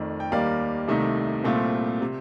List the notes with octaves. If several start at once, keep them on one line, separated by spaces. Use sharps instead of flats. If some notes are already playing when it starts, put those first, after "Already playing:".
Already playing: F2 D#3 A3 D5
G5
D#2 D#3 G3 A#3 D5 F5
C2 C3 D#3 A3 D#4
C2 A#2 A3 C4 F4
C3